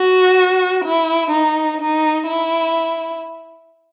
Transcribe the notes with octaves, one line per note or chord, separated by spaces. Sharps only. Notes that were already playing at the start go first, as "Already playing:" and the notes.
Already playing: F#4
E4
D#4
D#4
E4